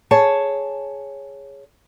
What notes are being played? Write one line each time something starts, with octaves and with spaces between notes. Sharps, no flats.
G#4 C#5 A5